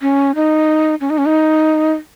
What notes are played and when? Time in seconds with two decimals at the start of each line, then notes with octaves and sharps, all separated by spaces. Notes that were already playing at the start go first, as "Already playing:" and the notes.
0.02 C#4
0.35 D#4
1.01 C#4
1.10 D#4
1.18 C#4
1.26 D#4